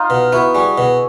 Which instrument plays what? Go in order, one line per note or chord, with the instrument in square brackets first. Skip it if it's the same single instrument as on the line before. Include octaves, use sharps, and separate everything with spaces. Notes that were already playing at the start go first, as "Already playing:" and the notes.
Already playing: [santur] D#4 F4
[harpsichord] B2
[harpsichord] B3 [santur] E4 F#4
[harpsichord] G3 [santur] F#4 G#4
[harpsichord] B2